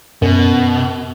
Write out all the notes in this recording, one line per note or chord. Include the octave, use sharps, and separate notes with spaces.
F#2 B2